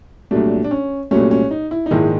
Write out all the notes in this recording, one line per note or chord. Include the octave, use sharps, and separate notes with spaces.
C2 A#2 F#3 A3 D4
D4
C#4
C2 A#2 F#3 A3 C#4
C#4
D#4
E4
D#4
A#1 G#2 D#3 G#3 E4